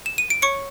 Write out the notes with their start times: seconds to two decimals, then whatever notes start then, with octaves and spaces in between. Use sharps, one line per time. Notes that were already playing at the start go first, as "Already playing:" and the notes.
0.06 E7
0.18 D#7
0.30 D7
0.42 C#5 C#6 C#7